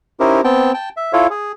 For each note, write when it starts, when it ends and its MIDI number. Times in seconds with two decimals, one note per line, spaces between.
0.20 0.41 61
0.20 0.41 63
0.20 0.41 64
0.20 0.41 67
0.20 0.41 70
0.20 0.41 72
0.44 0.72 59
0.44 0.72 60
0.44 0.72 79
0.44 0.72 81
0.74 0.89 79
0.74 0.89 81
0.97 1.12 76
1.13 1.27 64
1.13 1.27 65
1.13 1.27 69
1.13 1.27 73
1.13 1.27 77
1.30 1.52 68